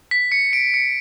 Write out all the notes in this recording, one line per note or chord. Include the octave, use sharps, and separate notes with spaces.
B6
C#7
D7
C#7